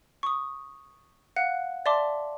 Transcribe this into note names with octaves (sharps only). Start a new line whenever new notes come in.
C#6 D#6
F5 F#5 F#6
D5 E5 A5 C6 D6